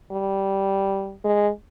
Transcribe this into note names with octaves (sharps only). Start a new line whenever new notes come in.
G3
G#3